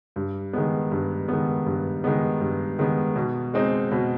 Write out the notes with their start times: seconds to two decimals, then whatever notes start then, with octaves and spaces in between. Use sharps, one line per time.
0.16 G2
0.53 D#3 G#3 B3
0.91 G2
1.28 D#3 G#3 B3
1.66 G2
2.04 D#3 G#3 B3
2.41 G2
2.79 D#3 G#3 B3
3.16 B2
3.54 G#3 C4 D#4
3.91 B2